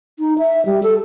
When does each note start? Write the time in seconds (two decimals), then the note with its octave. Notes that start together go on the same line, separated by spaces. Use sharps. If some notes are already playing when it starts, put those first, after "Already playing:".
0.19 D#4
0.38 E5
0.66 G3
0.83 A4